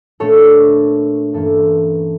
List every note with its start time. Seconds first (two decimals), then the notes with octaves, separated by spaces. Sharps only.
0.20 A#2 A3 D4 A4 C#5
1.33 G2 E3 A#3 C#4 A4